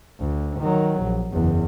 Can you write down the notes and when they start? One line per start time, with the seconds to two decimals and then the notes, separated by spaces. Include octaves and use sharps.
0.20 D2
0.60 D#3 F#3
1.02 A#1
1.32 F#1 E2